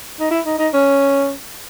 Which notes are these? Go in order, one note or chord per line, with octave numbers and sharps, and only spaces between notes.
D#4
E4
D#4
D#4
C#4